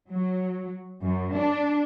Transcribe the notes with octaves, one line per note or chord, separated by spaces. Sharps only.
F#3
F#2
D4